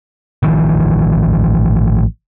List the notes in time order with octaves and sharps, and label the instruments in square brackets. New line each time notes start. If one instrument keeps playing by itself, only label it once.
[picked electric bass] A1 D#3 F3